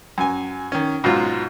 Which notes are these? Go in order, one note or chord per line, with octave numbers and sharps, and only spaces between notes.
F#2 G#5
D#3 C#4
G#2 B2 F#3 F4